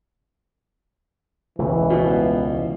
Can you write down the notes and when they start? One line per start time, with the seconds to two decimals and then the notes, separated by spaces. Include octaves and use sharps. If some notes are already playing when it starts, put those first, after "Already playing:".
1.58 E1 C#2 E3 A3
1.90 B2 F3